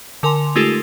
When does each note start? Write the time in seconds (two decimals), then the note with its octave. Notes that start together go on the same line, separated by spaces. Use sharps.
0.23 D3 A#4 G#5 C6 F7
0.55 G#3 A3 D#4 F4 G4 A4